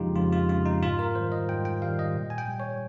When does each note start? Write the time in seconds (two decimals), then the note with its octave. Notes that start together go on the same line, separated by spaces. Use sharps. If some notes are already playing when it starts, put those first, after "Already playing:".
Already playing: F2 C#3 F3 G#3 D#4 F4 G4
0.16 F2 F4
0.33 F4
0.49 C#3 F3 G#3 F4
0.65 D#4
0.82 G#2 F4
0.99 A#4
1.15 D#3 G3 C5
1.32 D#5
1.49 G#2 G5
1.65 G5
1.82 D#3 G3 F5
1.99 D#5
2.15 A#2
2.30 G#5
2.38 G5
2.48 G3
2.60 C#5